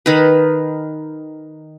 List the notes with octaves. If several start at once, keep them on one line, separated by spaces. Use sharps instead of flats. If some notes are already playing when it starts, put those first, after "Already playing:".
D#3 B4